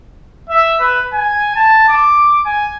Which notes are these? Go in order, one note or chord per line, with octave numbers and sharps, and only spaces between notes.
E5
B4
G#5
A5
D6
G#5